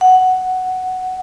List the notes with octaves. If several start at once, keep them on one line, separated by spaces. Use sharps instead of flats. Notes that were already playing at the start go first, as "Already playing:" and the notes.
F#5